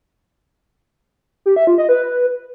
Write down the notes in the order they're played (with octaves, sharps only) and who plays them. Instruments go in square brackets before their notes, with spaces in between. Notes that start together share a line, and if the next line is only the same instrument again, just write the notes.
[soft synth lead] G4
E5
F4
D#5
B4